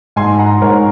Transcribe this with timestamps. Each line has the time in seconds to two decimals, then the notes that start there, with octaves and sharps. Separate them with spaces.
0.16 G#2 G#5 C6
0.39 F#5 A#5
0.62 G#2 A#4 C#5